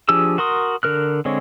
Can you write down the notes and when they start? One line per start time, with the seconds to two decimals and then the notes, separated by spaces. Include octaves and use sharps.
0.09 F3 D4 G4 G#4 E6
0.38 F#4 A#4 C6 D#6
0.83 D3 A#4 F6 F#6
1.25 D3 G#3 C4 C#5